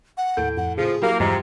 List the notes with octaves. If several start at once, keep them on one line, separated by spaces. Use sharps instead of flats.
F#5
D#2 A2 A4 G6 D7
F2 F#5
A#2 C#3 F3 G#4
F#3 A#3 E4 G4
E2 G2 C3 F3 G#3 A#5